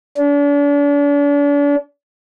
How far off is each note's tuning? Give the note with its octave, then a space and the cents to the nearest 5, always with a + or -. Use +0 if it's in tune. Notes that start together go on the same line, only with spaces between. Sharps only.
D4 -40